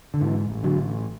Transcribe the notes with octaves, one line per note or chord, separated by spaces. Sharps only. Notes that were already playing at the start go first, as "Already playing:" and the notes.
D3
G#2 E3
A1
D3 F#3
A1